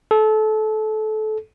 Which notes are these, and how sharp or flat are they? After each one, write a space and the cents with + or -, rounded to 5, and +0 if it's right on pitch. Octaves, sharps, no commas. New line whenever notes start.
A4 -25